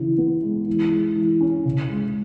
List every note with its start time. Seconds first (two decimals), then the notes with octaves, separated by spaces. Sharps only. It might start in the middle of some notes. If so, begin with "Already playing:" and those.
Already playing: C#3 E3
0.18 B3
0.43 G#3
0.67 E3
0.92 G#3
1.16 E3
1.41 C#4
1.65 C#3
1.90 G#3